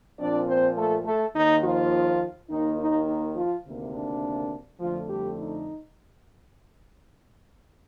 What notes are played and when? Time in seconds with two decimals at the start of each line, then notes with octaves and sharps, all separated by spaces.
0.19 A#2 F3 C4 D4 D5
0.48 C4 C5
0.77 A3 A4
1.05 A3 A4
1.35 D#2 D#3 A#3 D#4
1.63 F3 F4
2.50 D#2 D#3 A#3 D#4
2.79 D#4
3.07 D#4
3.36 F3 F4
3.65 D2 C3 D#3 A#3
3.94 D4
4.80 F2 D3 F3 A3 F4
5.09 G3 G4
5.38 D#4